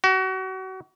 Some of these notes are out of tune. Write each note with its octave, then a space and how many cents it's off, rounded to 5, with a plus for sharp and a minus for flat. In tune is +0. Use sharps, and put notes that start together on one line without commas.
F#4 +30